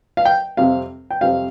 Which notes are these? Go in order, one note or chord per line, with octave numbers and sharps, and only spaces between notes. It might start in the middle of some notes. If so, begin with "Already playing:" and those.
F5
G5
F2 C3 G3 F5
G5
F2 C3 G3 F5